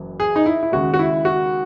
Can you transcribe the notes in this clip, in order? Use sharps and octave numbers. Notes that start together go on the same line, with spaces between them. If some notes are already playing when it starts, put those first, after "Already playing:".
Already playing: F#1 F#2 E3
G#4
D#4
E4
E4
D#2 C#3 G#3 F#4
F#4
E4
F#4